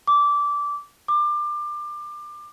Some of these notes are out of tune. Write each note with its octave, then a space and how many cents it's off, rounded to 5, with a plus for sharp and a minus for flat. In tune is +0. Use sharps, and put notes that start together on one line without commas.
D6 -15
D6 +25